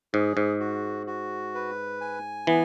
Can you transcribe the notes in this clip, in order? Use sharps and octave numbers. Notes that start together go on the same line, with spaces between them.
G#2 G#4
G#2
F#4
F#4
B4
G#5
E3 B3